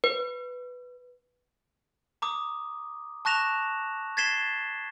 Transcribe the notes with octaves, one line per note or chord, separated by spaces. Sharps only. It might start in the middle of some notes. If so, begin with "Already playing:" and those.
B4
A#5 D6 D#6
A5 C#6 F#6 A#6 E7 F7
G#6 A6 B6 C7 E7 G7